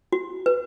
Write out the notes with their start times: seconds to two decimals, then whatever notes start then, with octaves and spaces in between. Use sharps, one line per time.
0.12 F#4
0.46 B4